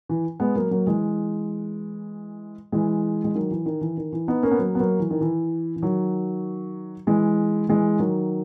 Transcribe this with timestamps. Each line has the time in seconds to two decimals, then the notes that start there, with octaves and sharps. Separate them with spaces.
0.09 E3
0.40 G#3 B3
0.55 F#3 A#3
0.71 F#3 A#3
0.87 E3 G#3
2.72 E3 G#3
3.24 G#3
3.35 D#3 F#3
3.51 E3
3.66 D#3
3.81 E3
3.97 D#3
4.12 E3
4.28 B3 D#4
4.43 A#3 C#4
4.51 B3
4.59 F#3 A#3
4.75 B3
4.79 F#3 A#3
5.00 E3
5.11 D#3
5.21 E3
5.76 E3
5.82 D#3 F#3
7.07 E3 G#3
7.69 E3 G#3
7.99 D#3 F#3